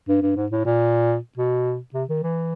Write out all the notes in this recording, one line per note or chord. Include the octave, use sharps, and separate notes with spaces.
G2
G2
G#2
A2
A#2
B2
C3
D#3
E3